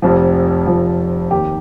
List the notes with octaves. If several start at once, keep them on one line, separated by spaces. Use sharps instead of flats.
F1 F2 F3
F1 F2 F3
D#2 D#3 G4